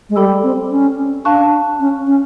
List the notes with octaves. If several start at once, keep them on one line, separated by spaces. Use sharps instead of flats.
G#3
G3 A4 D5 G5 B5 E6
C4
C#4
D4 F5 A5 C#6 F#6
C#4
C#4